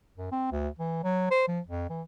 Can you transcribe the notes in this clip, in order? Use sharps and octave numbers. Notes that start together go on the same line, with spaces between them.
F#2
C4
D2
E3
F#3
C5
F3
F2
E3